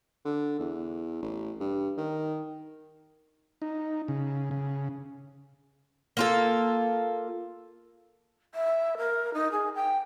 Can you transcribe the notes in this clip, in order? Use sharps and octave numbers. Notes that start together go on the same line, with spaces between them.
D3
E2
A1
G2
D#3
D#4
C#3
C#3
A#3 F4 A4
E5
A#4
D#4
G#4
G5